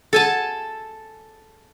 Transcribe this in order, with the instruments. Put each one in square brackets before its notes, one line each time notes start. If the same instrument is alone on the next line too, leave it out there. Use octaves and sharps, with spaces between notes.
[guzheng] A4 G#5 A5